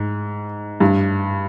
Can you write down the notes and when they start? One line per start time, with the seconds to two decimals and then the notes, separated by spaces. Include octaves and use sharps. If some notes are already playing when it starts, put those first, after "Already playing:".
Already playing: G#2
0.80 G2